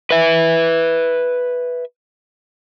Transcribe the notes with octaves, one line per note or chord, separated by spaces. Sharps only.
B4 E5